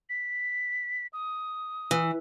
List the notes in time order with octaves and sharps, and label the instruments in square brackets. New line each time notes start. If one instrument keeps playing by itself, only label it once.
[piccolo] B6
D#6
[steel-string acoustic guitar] E3